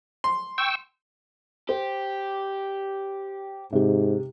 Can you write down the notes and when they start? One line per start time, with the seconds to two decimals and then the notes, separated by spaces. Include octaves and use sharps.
0.24 C6
0.58 G5 C#6 E6
1.69 G4 C5
3.73 G#2 C3 G4